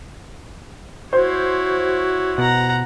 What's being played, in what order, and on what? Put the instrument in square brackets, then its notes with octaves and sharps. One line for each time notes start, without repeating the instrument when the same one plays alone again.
[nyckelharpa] E4 C#5 [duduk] F#4 [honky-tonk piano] C5
[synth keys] B2 [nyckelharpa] F#5 A#5